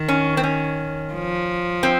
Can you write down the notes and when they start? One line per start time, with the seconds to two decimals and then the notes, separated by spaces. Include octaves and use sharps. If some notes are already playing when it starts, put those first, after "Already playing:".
Already playing: D#3
0.08 C#4
0.37 C4
0.43 C#4
1.14 F3
1.83 C4